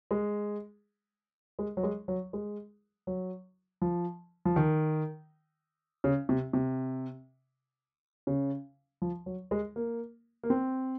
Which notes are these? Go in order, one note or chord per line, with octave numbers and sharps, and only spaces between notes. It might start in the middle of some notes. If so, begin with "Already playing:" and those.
G#3
G#3
F#3
G#3
F#3
G#3
F#3
F3
F3
D#3
C#3
C3
C3
C#3
F3
F#3
G#3
A#3
A#3
C4